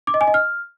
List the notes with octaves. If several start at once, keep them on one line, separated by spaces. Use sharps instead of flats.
D6
D#5
G#5
D#5
F6